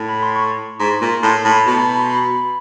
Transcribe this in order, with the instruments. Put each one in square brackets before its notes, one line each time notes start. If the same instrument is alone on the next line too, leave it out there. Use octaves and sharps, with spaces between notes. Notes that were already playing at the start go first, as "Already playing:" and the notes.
Already playing: [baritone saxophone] A2
[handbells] B5
C6
C#6
[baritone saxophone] G#2
A#2
[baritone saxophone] A2 [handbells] C6
[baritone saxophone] A2 [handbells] B5
[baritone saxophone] B2 [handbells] A5
[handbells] A#5
B5
C6
B5